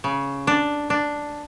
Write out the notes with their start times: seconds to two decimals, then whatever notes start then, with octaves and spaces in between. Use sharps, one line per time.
0.04 C#3
0.47 D4
0.90 D4